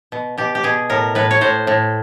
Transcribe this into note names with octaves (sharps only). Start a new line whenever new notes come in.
B2
B2 G4
G4
B2 G#4
A2 A#4
A2 B4
C#5
A2 C5
A2